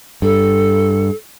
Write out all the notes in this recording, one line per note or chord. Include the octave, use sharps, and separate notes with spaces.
G2 A4